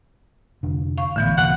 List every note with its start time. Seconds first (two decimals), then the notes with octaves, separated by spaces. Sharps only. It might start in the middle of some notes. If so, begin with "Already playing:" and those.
0.63 F1 D3
0.98 F5 C#6
1.16 A#1 A2 D3 E3 B3
1.37 C2 G2 A#2 F#5